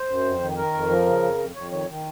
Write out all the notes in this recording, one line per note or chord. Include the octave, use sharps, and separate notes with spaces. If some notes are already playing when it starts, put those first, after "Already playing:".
Already playing: C5
F#2
F2
D#3
D#3 A#4
F2
F3
C#3
F2
F2
F2 C#5
D#3 C#5
D#3